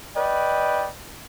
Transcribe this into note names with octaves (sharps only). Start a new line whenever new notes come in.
B4 D5 D#5 G5